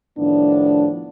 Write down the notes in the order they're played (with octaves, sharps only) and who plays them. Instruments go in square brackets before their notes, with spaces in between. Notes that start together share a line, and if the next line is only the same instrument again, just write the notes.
[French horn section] A2 D#3 F3 B3 D4